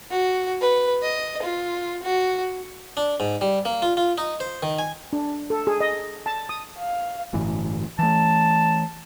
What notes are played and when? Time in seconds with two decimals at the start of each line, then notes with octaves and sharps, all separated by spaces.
0.11 F#4
0.61 B4
1.02 D#5
1.42 F4
2.03 F#4
2.97 D4
3.20 G#2
3.41 G3
3.65 A#3
3.82 F4
3.97 F4
4.18 D#4
4.40 C5
4.63 D#3
4.79 G#5
5.13 D4
5.50 A4
5.67 G#4
5.81 D#5
6.26 A5
6.49 D#6
6.78 F5
7.33 G1 A2 E3
7.99 E3 A3 A5